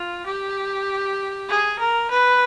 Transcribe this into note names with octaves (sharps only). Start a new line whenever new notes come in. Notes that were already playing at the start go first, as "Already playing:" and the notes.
Already playing: F4
G4
G#4
A#4
B4